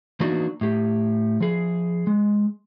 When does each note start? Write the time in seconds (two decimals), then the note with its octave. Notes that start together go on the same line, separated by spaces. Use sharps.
0.20 E3 A#3 B3 D4 D#4 F#4
0.61 A2 G4
1.40 F3 G#4
2.07 G#3